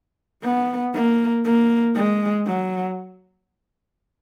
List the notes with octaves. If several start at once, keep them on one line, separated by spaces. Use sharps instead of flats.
B3
A#3
A#3
G#3
F#3